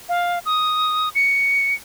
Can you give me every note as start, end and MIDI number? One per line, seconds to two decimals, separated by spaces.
0.09 0.39 77
0.46 1.09 87
1.15 1.74 97